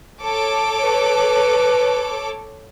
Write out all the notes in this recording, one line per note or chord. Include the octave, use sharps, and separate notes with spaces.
A4 C#5 D6
B4